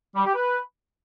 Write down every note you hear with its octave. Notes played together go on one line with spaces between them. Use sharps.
G3
G4
B4